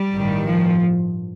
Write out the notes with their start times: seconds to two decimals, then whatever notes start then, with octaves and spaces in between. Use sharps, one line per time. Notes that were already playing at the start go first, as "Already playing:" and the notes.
Already playing: G3
0.13 A1 G2 D#3
0.47 F3